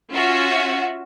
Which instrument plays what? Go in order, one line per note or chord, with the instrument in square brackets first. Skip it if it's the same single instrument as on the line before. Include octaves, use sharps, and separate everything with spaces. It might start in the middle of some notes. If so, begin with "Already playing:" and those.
[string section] C#4 F4 F#4 E5